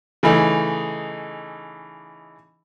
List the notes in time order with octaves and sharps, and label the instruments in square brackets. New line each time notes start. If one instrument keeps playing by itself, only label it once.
[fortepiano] C#3 E3 A3 D#4